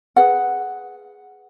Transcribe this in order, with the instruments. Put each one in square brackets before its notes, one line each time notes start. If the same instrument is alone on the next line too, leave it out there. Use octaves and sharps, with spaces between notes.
[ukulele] G#4 B4 F#5